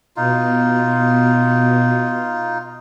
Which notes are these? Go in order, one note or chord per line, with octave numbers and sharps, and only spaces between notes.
B2 D#4 F4